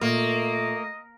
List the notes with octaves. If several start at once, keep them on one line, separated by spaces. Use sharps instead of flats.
A#2 A3 A#3 D#5